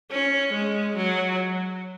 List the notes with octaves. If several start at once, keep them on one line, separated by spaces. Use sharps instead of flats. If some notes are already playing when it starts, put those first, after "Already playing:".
C#4
G#3
F#3